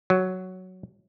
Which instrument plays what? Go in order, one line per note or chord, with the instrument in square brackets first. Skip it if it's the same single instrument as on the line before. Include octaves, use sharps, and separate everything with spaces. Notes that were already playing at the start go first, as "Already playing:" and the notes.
[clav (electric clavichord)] F#3